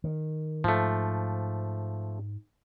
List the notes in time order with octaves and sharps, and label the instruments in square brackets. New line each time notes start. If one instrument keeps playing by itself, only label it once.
[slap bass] D#3
[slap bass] G#2 [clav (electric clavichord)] F3 A3